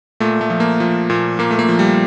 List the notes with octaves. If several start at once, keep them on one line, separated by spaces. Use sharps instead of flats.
A#2 A3
A3
F3
A#3
F3
A#2
A#2 A#3
A3
A#3
F3
G3